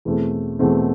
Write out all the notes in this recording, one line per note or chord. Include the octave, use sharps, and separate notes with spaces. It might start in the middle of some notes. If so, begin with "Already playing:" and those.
E2 B2 A3 C4
E2 B2 A3 C4